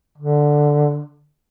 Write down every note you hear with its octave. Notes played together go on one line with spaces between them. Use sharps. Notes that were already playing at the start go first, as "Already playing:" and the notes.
D3